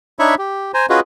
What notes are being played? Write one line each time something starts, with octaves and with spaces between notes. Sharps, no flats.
D4 D#4 C#5 E5 B5 C#6
G4
C5 G#5 A#5
C#4 F4 F#4 G#4 B4 D#5